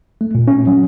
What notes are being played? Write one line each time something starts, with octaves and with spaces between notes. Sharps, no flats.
A3
A#2
C#4
F#3